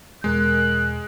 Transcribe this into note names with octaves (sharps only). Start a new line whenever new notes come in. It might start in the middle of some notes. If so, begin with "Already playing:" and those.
E2 B2 G#3 A#4 F#6